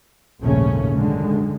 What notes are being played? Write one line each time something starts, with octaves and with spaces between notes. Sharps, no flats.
A#1 D#2 G#2 C#3 A3 C#4
F#2 D3 D#3 G#3